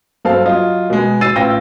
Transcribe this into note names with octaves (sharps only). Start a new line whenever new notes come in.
G2 F#3 C4 A4 F5
F#3 F4 D#5
B2 G#3
E6 A6 C7 D#7
A1 F4 G5 E6 A#6